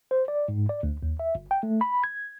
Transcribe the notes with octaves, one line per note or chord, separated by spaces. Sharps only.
C5
D5
G#2
D5
D2
D#2
E5
G1
G5
A3
B5
G#6